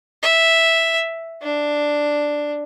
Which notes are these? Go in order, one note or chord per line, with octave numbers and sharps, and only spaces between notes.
E5
D4